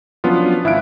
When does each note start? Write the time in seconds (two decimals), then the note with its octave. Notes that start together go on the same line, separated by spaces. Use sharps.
0.24 F3 F#3 B3 C#4 D4 F4
0.64 G#1 E4 E5 F5 F#6 D7